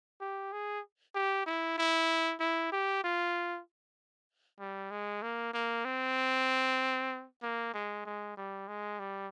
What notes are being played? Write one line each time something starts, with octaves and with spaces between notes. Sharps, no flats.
G4
G#4
G4
E4
E4
E4
G4
F4
G3
G#3
A#3
A#3
C4
A#3
G#3
G#3
G3
G#3
G3